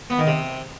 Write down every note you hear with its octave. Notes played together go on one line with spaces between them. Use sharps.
B3
D#3
C3